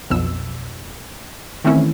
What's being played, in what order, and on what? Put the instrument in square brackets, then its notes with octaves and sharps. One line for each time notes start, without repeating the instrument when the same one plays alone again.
[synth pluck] B1 F2 B2 E6
D#3 E3 A3 C4 C#4 E4